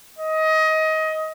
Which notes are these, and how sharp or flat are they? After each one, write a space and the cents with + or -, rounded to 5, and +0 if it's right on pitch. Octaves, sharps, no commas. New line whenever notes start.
D#5 +20